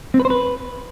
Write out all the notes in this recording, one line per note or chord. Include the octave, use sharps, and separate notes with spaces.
C4
B4
C5
B4